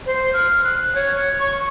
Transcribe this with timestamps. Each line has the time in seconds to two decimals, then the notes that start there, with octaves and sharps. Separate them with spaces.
0.06 C5
0.33 F6
0.64 F#6
0.95 C#5
1.40 C#6